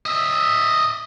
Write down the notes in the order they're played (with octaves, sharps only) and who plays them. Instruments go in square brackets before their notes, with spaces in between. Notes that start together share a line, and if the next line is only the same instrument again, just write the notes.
[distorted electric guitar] D#5 E5